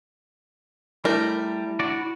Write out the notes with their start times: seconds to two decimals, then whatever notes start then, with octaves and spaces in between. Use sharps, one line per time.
1.05 G3 A3 E4 A#4
1.79 D4 F#4 D5